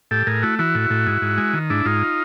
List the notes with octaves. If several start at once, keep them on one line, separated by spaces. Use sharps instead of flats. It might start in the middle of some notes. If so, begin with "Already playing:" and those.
A2 G4 A4
A2 G#4 A#4
A3 E4 F#4
E3 E4 F#4
A2
A2
G#2
G#2
G#3
D#3
G#2 D4 E4
G#2 D#4 F4